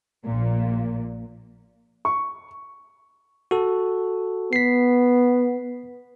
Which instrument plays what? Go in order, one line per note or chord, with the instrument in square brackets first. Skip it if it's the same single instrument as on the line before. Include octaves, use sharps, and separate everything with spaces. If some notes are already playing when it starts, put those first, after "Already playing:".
[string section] A#1 A#2
[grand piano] C#6
[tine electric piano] F#4 A4
[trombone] B3 [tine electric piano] B6 C7